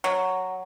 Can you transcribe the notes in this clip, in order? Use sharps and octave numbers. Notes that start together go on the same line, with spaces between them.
F#3